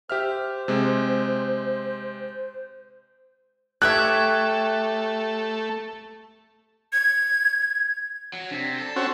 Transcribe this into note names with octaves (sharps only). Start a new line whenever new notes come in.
G4 C5 E5 F6
C3 G#3 C4
A3 G4 C#5 E5 F#6
G#6
F#3
C3 D4
A4
C4 C#4 F#4